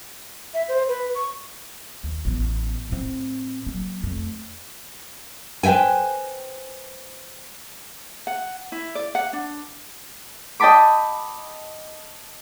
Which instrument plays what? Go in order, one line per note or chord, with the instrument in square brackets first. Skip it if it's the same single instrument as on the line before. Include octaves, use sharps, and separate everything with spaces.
[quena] E5
C5
B4
C#6
[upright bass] D#2
A1 B3
A2 C4
F#3 A#3
F2 A3
[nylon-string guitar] B4 C5 E5 G5 G#5
[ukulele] F#5
E4
D5
F#5
D4
[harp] D#5 G5 A5 B5 D6